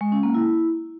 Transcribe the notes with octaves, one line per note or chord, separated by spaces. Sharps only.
G#3
C#4
A#3
E4